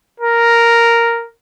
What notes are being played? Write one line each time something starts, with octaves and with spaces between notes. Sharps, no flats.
A#4